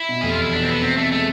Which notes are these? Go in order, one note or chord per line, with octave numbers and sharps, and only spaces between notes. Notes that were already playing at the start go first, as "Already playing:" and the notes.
Already playing: E4
B2
F1 G#4
F4
E2 E4
B2 D4
C4
E2 B3
C3 C4
C3 A3
G#3 A3